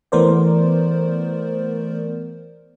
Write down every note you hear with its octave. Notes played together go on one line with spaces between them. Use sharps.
E3 A3 B3 A#4 C5 D5